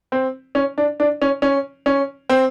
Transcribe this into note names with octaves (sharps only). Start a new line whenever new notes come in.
C4
C#4
D4
D4
C#4
C#4
C#4
C4